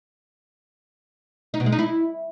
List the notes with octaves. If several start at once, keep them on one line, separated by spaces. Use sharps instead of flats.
D#4
B2
G#3
D#4
E4